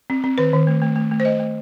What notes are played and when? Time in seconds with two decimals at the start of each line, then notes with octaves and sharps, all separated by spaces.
0.10 C4
0.24 C4
0.38 D#3 B4
0.53 D#3
0.67 A3
0.82 A3
0.96 A3
1.11 A3
1.20 C5
1.25 A3 D#5
1.40 A3